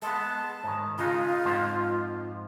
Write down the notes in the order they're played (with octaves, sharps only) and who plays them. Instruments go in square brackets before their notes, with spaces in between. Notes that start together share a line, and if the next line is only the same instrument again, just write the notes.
[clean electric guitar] G#3 B3 [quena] A5
[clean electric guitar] G#2 D#3
[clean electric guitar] C#3 G#3 D#4 [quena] F4
[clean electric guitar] F2 G#2 F3